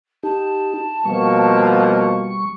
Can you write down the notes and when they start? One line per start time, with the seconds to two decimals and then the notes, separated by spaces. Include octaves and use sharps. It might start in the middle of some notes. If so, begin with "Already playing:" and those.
0.23 D#4 G4 A5
1.05 B2 F3 G3 A#3 C#6